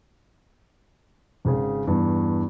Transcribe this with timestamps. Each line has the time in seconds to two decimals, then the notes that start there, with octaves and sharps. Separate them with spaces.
1.45 G#1 C#3 G#4
1.87 E2 G2